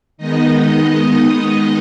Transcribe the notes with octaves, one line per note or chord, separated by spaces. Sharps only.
D#3 G#3 B3 D#4 D#5
D#5